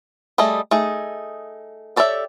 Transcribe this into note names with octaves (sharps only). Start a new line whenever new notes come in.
G3 A3 G#4 D#5
A3 D#4 G#4
G4 A4 C#5 D5 E5